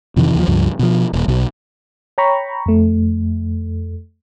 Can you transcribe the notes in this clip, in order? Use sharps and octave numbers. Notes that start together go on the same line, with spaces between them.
F2 C3 D#3 E3
D#2 F3
C#2 G2 F3
B2 F3
D#1
B1
C#5 G5 A#5 B5 C#6
F2 A3